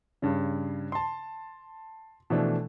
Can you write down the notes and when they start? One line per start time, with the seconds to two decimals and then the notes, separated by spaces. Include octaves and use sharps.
0.22 G2 C#3
0.92 A5 C6
2.30 B2 E3 F3 A3 D4